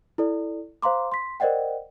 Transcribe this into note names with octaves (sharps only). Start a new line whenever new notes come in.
E4 A4 D5
C5 F5 A#5 C6 D6
C6 B6
A#4 C5 D5 D#5 F#5 G5